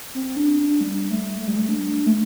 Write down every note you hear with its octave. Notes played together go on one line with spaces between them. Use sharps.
C4
D4
D4
G3
A3
A3
G3
A3
D4
A3